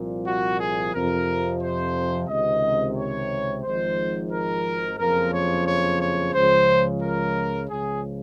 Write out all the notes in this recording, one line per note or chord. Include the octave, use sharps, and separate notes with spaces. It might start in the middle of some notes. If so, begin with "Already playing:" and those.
Already playing: C2 A#2 F3
F#4
G#4
F2 C3 F3 A#4
C5
C#2 C3 D#3 D#5
C#5
G#1 G#2 F3 C5
A#4
F#1 F2 C#3 F3 A#4
C#5
C#5
C#5
C#2 C#3 F3 C5
A#4
C#2 C#3 F3 G#4